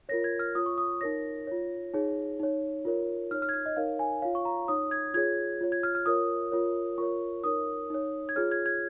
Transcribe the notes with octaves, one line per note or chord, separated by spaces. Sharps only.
F4 A#4 C#5 A#6
G#6
F6
F4 C#5 D#6
C#6
D#6
D#4 A#4 C#5 A#6
F4 C#5
D#4 G#4 C#5
D#4 C#5
F4 A#4 C#5
D#4 C#5 F6
F6
G#6
F6
D#5
D#4 A#4 C#5 F5
G#5
F4 C#5 F5
C#6
A#5
D#4 C#5 D#6
G#6
F4 G#4 C#5 G#6
F4 C#5
G#6
F6
F6
F4 A#4 C#5 D#6
F4 A#4 C#5
F4 A#4 C#5 C#6
D#4 A#4 C#5 D#6
D#4 C#5
G#6
F4 G#4 C#5 F6
G#6
G#6